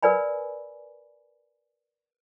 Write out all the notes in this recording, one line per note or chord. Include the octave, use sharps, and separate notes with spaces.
A#4 B4 D5 G#5 B5